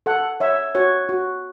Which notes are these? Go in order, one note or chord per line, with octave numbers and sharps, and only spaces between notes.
A4 F#5
C#5 E5
F#4 C#5
F#4